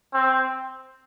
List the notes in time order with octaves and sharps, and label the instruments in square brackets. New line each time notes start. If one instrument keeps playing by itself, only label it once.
[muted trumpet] C4